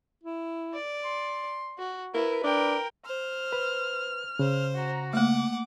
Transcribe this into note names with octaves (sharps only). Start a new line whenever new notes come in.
E4
D5
C6
F#4
E4 A#4 B4
D4 A#4 G5
C5 F6
B4
C#3 C5
F#4 A#5
A3 A#3 F#5 D6